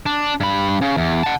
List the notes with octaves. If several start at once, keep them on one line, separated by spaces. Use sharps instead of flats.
D4
G2 B5
C#3
E2
F#5 A5